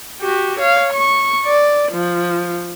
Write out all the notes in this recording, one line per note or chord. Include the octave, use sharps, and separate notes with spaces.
F#4 G4
C#5 F5
C#6
D5
F3